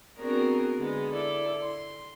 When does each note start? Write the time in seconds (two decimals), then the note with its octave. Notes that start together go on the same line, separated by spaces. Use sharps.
0.19 B3 C4 D4 F#4 G#4 A#4
0.80 D3 G#3 B3
1.11 E4 A4 D5
1.63 C6